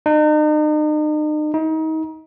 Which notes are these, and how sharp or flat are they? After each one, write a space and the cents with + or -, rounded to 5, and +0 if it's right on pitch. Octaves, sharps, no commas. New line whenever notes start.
D#4 -40
D#4 +30